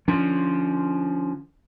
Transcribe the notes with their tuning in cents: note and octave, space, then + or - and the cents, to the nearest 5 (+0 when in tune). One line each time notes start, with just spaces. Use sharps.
D3 +25 F3 -5 C#4 +15